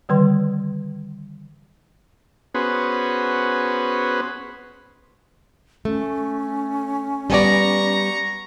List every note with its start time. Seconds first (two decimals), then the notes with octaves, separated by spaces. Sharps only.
0.09 D3 D#3 G3 B4 C6
2.54 B3 C#4 F#4 G#4 B4 C5
5.85 A3 C#4
7.30 G3 B3 D5 A#5 C#6